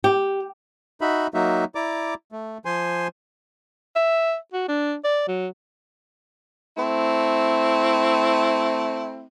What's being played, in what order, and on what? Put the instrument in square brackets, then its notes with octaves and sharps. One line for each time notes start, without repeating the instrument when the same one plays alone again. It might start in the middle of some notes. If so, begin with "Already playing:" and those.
[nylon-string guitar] G4
[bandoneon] D#4 F#4 E5 B5
F#3 A#3 D#4 F#4 E5
E4 D5 A#5 D6
A3
F3 C5 G#5 C6
[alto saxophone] E5
F#4
D4
D5
F#3
[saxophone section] A3 C4 E4